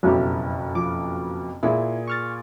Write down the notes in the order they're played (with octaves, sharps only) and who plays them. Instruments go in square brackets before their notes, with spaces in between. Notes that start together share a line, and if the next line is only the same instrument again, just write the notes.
[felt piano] F#1 F2 B2 [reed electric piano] F#3 E4 G4
[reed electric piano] F3 D6
[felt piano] A#2 G#4 [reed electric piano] E4
[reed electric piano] C#6 F6 A6